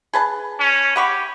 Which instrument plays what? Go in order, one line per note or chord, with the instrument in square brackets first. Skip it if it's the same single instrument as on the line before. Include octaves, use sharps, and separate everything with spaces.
[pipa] G#4 B4 A5
[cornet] C#4
[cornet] G4 [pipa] F#5 B5 C#6